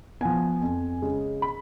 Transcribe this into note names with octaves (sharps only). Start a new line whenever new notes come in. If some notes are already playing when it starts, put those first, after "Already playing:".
F3 B3 G#5
F2
C#3 G#3
B5